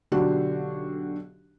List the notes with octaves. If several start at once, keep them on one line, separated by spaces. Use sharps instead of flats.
B1 D3 D4 F#4 G4